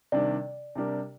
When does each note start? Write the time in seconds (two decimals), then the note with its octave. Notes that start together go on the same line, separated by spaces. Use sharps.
0.12 C3 D#3 G3 D4 D5
0.75 C3 G3 D4 G4 A#4